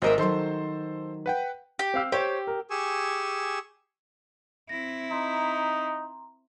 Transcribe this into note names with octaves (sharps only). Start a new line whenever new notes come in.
G#1 F#4 A#4 C5 D#5 E5
D#3 F#3 A4 C5 C6
B4 F#5 G5
G4
C4 F5 E6
G4 C5 C#5
A#4
G4 G#4 G#5 C#6 E6
C4 E4 A#6
D#4 A#5 C6